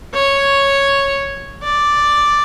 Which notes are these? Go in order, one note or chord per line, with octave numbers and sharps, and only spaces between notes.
C#5
D5